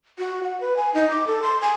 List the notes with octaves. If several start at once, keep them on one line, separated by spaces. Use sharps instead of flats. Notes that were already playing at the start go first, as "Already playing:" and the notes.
F#4
F#5
B4
G#5
D#4
D6
A4
C6
G#5